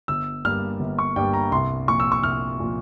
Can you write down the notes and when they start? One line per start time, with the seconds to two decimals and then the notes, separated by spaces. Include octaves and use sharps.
0.08 G1 E6
0.44 G2 G3 A#3 F6
0.80 G1
0.99 C#6
1.16 G2 G3 A#3 G5
1.34 A#5
1.52 C2 C6
1.88 A#2 F3 C#6
2.00 E6
2.12 C#6
2.23 C2 F6
2.60 A#2 F3